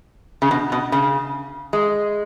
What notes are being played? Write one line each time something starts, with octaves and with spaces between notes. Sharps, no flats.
C#3
B2
B2
C#3
G#3